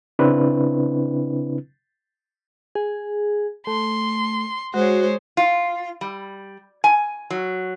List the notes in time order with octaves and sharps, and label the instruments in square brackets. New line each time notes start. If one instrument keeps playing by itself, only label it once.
[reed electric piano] C#3 C4 D4 E4 B4
[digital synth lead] G#4
[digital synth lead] A3 [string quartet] C6
[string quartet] G#3 C5 C#5 [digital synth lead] F#4
[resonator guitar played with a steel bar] F4
G3
G#5
F#3